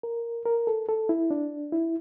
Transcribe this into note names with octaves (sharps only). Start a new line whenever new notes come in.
A#4
A#4
A4
A4
E4
D4
E4